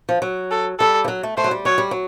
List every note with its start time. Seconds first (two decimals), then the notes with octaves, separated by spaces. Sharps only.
0.09 F3
0.22 F#3
0.51 A4
0.80 G3 A4
1.04 F3
1.08 F#3
1.23 A3
1.37 A3 C5
1.44 F#3
1.51 G3
1.65 F#3 C#5
1.78 G3
1.91 F#3